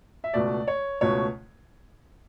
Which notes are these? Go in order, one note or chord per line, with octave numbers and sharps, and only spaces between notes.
E5
C#2 B2 A3 D5
C#5
C#2 B2 A3 C#5